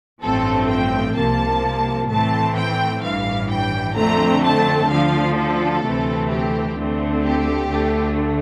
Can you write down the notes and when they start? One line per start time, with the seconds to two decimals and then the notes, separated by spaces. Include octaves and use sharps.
0.23 A1 G2 F3 A3 C4 A4
0.70 G5
1.17 C2 C3 F3 A#3 A5
2.10 A2 E3 A3 C4 A5
2.57 G5
3.03 A1 G2 E3 F5
3.51 G5
3.97 F2 D3 A3 C4 A#5
4.44 A5
4.90 D2 D3 F3 F5
5.37 A4
5.83 D2 C3 E3 A3 C4
6.30 G4
6.77 D2 D3 A3 C4
7.23 G4
7.70 D2 D3 A3